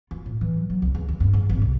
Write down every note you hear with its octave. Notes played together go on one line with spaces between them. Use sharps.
F4
A2
E3
F#3
F#3
C2
C#2
D#2
G2
G#2
G#1
C2